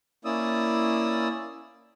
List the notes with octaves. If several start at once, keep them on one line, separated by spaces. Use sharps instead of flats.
A#3 C#4 E4 D5 D#6 E6